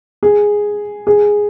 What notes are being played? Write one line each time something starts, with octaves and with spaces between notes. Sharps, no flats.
G#4
G#4